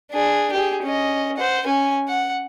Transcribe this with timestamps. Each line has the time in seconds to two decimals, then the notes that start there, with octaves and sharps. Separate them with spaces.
0.11 D4 G#4
0.52 G4 G#4
0.83 C#4 D#5
1.37 C5 F#5
1.66 C#4 G#5
2.08 F#5